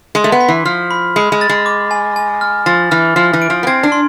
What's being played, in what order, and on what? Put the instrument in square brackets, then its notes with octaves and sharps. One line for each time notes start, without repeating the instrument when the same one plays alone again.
[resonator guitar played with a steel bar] G#3 [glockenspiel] C6
[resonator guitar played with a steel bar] A3
B3
[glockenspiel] B6
[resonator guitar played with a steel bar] E3
[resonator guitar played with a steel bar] F3 [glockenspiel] F6
[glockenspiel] B5
[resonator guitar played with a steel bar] G#3 [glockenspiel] B5
[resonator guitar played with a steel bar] G#3
[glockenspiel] A6
[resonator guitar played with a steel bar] G#3
[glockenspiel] D6
G#5
G#5
F6
[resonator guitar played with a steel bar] F3 [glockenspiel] A6
[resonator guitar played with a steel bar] E3 [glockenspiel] F6
[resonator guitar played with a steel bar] F3 [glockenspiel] F6
[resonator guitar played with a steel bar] E3
[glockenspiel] D7
[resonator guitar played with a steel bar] F3
B3
[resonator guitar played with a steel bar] C4 [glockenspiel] G#6
[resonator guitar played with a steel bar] D4
[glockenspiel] C6